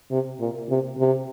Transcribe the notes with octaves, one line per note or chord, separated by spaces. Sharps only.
C3
A#2
C3
C3